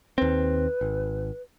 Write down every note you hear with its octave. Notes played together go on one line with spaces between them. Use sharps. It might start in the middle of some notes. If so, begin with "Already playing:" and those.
D#2 C4 B4
G#1